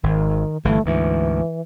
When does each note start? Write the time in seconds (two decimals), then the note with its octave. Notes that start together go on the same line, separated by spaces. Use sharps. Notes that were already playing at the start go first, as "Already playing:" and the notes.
0.03 G#1 D#3
0.65 G1 E3 A3
0.86 D2 G#2 E3